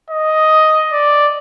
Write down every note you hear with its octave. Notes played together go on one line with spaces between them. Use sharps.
D#5
D5